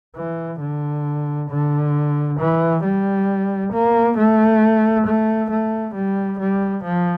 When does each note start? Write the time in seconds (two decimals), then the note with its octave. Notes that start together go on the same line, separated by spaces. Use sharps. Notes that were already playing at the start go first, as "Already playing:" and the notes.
0.17 E3
0.61 D3
1.51 D3
2.39 E3
2.84 G3
3.73 A#3
4.17 A3
5.07 A3
5.51 A3
5.95 G3
6.39 G3
6.84 F3